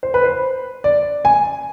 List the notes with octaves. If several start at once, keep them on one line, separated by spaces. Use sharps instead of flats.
C5
B4
C5
D5
G#5